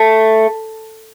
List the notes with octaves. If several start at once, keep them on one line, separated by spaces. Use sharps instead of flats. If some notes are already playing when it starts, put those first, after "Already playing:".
Already playing: A3